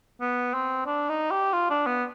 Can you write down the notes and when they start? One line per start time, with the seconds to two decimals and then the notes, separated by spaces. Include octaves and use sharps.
0.20 B3
0.54 C4
0.86 D4
1.09 D#4
1.31 G4
1.53 F4
1.70 D4
1.86 B3